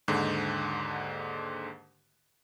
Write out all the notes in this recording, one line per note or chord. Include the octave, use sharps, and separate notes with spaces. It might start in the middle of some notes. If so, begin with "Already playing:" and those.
D#2 G#2 D3